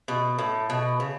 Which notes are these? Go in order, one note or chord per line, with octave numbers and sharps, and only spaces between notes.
B2
A2
B2
C#3